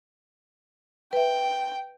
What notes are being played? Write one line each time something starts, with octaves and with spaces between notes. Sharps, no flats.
B4 E5 G5